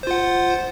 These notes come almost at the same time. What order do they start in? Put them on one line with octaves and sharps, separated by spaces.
C5 F4 F#5